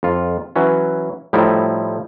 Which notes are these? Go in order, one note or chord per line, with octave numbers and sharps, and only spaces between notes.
F2 F4
E3 F#3 C#4
A2 F3 G3 D#4 E4